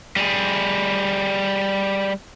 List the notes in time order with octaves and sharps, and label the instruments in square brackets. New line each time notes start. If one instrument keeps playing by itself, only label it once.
[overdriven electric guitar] G3 G#4